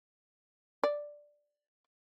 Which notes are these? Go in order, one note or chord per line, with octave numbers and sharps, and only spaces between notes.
D5